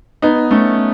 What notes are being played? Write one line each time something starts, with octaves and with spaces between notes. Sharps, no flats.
B3 D#4
A3 C#4